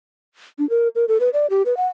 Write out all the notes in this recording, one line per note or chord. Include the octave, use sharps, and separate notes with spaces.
D4
A#4
A#4
A4
B4
D5
G4
B4
F#5